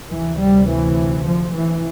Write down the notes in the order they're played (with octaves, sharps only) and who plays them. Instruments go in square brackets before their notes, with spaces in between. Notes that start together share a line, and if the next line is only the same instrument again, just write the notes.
[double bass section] D2 C3 E3
G3
E3
F3
E3